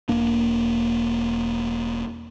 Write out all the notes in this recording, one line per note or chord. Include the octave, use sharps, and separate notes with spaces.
E1 A#3 D4